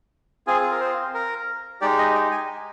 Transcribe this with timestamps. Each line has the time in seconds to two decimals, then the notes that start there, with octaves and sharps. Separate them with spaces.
0.47 C4 F4 G#4 G#5
0.62 G#4
0.71 A#4
0.80 C5
1.14 A#4
1.81 G#3 D#4 G4 D5
1.98 D#5
2.15 G5
2.31 G#5